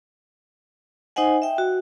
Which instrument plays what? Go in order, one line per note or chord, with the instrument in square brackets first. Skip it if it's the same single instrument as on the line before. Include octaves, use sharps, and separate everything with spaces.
[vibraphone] D#4 C5 D#5 F#5 G#5
E5 G5
F#4